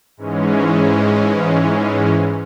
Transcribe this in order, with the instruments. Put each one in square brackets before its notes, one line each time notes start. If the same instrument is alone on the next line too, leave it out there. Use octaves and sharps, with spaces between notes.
[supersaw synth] G#2 E3 G#3 C#4